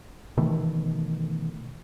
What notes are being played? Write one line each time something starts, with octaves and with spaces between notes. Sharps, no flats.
B2 D#3 E3 A3